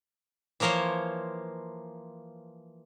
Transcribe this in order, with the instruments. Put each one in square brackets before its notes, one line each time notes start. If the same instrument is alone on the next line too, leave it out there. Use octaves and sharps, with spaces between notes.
[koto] E3 F3 A#3 A#4 C5 C#5